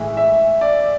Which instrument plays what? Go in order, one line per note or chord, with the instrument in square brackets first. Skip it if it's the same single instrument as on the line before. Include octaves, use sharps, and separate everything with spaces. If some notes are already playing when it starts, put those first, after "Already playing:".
Already playing: [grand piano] A2 E3 G#3 E5
E5
D5